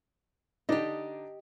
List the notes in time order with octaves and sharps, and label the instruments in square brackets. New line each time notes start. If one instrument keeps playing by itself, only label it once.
[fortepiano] D3 D4 D#4 [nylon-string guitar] G4 D#5